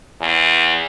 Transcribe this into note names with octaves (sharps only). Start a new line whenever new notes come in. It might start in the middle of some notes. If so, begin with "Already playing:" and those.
E2